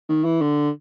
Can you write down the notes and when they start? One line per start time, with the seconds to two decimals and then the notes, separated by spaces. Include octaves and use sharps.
0.09 D#3
0.25 E3
0.41 D3